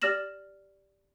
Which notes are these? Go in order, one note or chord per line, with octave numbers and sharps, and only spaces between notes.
G4 D5 F6 A#6 E7 F#7